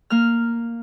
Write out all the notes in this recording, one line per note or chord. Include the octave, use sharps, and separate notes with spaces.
A#3 F6